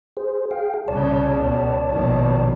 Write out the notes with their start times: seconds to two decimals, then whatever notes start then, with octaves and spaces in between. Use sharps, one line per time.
0.17 G#4 C5
0.51 G#4 F5 G5
0.88 C2 A#2 C#3 C#5 D5 A5
1.38 C#2 B2
1.90 A#1 B2 D#3